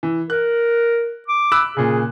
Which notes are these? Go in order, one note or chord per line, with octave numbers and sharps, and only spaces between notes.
E3
A#4 F#6
D6
B5 E6 F#6
A#2 C#3 G#4